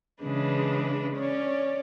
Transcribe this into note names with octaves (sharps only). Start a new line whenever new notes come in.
C#3 E3 G#3 D4 B4
C#4 C#5 D5